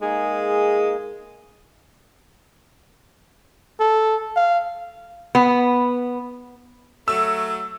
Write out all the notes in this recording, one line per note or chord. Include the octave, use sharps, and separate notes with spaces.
G#3 A#3 D#4 G#4
A4
F5
B3
F#3 A3 E6